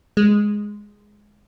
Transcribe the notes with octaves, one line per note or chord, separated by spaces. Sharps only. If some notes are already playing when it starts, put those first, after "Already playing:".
G#3